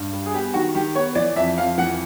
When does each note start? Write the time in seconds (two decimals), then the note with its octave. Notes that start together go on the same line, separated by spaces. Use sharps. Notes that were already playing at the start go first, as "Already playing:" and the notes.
Already playing: G2
0.13 G3
0.26 G#4
0.34 B3 G4
0.54 D#3 F#4
0.75 D#3 G4
0.95 B3 C#5
1.15 E3 D5
1.36 F2 E5
1.58 F2 F5
1.78 E3 F#5